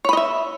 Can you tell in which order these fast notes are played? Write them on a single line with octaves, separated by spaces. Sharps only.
C#5 B5 D#5 E5